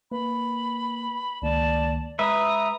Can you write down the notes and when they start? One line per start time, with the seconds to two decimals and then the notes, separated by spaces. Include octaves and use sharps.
0.12 A#3 B4 B5
1.42 C#2 D#3 A#3 D5 A5
2.19 G#3 B4 E5 A#5 D#6